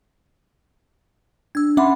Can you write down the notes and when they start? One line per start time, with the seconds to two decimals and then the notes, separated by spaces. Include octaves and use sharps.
1.55 D4 E6 G#6
1.77 C#4 E5 F#5 B5 C6 D6